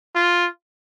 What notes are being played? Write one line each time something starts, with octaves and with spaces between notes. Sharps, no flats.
F4